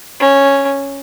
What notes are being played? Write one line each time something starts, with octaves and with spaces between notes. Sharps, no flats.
C#4